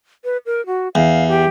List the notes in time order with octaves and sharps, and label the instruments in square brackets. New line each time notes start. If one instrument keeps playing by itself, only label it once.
[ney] B4
A#4
F#4
[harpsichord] E2 [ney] F5
[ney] G4